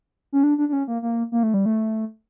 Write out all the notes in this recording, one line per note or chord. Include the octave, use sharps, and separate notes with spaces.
C#4
D4
D4
D4
C#4
A#3
A#3
A#3
A3
G3
A3